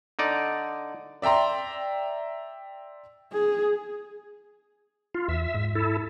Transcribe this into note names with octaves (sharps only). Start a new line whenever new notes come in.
D3 D#4 D5
D5 E5 G5 A#5 C6
G#4
F4
E2 E5
G#2
E4 A4